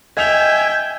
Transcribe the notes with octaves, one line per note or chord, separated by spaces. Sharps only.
D#5 E5 G5 G#5 F7